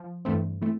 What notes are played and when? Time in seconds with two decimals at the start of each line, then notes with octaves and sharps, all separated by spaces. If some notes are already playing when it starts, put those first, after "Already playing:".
Already playing: F3
0.25 G2 E3 A3 C4
0.62 E3 A3 C4